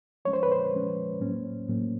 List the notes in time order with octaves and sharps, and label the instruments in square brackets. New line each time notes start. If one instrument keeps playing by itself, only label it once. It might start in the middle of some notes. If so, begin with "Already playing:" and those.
[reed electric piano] F3 G#3 C#4 C#5
C5
B4
C5
F3 G#3 C#4
A2 F#3 A#3 C#4
A2 F#3 A#3 C#4